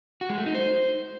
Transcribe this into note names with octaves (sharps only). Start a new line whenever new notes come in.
F#4
G#3
A3
D#4
C5